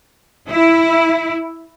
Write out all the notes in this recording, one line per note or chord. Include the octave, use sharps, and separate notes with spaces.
E4